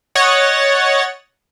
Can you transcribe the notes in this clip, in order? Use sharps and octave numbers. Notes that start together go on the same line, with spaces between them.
C#5 D#5 F#5 A6